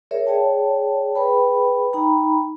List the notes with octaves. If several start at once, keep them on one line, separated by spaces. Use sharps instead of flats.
G#4 A#4 C#5 D5 E5
G#4 C#5 D5 G5 A5
G#4 B4 G5 B5
D#4 G5 A#5 B5